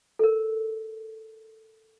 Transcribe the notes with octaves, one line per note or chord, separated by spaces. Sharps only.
A4 A#4